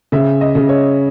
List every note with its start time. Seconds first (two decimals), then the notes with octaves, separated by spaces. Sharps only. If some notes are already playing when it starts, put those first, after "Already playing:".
0.12 C#3 E5
0.41 D#5
0.55 C#3
0.69 C#5